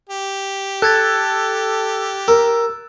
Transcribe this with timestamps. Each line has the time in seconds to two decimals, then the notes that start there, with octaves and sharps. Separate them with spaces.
0.09 G4
0.82 A4 F#6 G#6 A6
2.28 A#4 E6